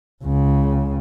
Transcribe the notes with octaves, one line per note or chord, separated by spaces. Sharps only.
C#2 C#3